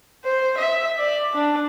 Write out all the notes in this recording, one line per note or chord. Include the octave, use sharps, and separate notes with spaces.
C5
E5
D5
D4